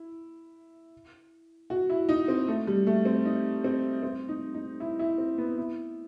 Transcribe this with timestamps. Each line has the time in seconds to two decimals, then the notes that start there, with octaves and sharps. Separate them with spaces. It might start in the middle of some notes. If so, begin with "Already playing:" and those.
Already playing: E4
1.70 F#4
1.90 E4
2.09 D#4
2.28 C4
2.48 A3
2.67 G3
2.87 A3
3.05 C4
3.25 D#4
3.64 C4
4.03 C4
4.29 D#4
4.54 D#4
4.80 E4
4.99 E4
5.18 C4
5.38 B3
5.58 E4